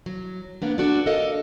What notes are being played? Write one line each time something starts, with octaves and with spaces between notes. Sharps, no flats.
F#3
A#3 B3 D4
D4 F#4 A4 D5
A4 A#4 D#5 F5